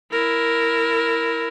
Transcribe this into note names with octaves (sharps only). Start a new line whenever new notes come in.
E4 A#4